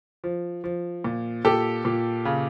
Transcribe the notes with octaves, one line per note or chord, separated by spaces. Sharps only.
F3
F3
A#2
A#2 G4 A4
A#2
C#3